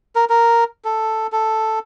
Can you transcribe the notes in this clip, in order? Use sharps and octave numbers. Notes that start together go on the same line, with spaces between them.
A#4
A#4
A4
A4